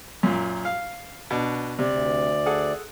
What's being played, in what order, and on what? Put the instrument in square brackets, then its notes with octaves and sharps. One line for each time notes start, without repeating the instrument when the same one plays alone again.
[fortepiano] F#2 A#2
F5
B2 D4
[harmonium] D2 D5 [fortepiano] C3
[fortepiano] G#4 A4 F#5